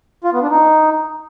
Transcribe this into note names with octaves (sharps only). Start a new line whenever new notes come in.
F4
B3
D4
D#4